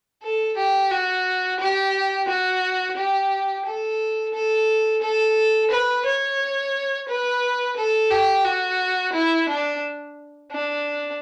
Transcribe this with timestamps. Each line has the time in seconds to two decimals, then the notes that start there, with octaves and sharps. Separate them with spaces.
0.22 A4
0.57 G4
0.91 F#4
1.60 G4
2.28 F#4
2.96 G4
3.65 A4
4.33 A4
5.02 A4
5.70 B4
6.05 C#5
7.08 B4
7.76 A4
8.11 G4
8.45 F#4
9.13 E4
9.48 D4
10.51 D4